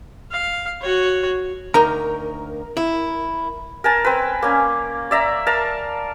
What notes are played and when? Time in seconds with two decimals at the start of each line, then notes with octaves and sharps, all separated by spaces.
0.31 F5
0.81 F#4 C#5
1.74 D2 D#4 A#4 A#5
2.77 E4
3.84 A#4 G#5 A5
4.04 C4 B4
4.42 A#3 C#4
5.11 D5 E5 A#5
5.47 A#4 F5 A5